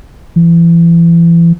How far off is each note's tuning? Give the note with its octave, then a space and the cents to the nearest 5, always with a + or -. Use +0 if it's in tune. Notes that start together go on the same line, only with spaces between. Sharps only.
E3 +35